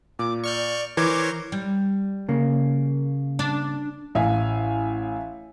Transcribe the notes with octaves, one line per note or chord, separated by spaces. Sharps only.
A#2 D6
D5 C#6 F6 G6
E3 A#4 C5 C#5 D6 G#6
G3
C#3 A#3
D4
A1 E5 F5 G#5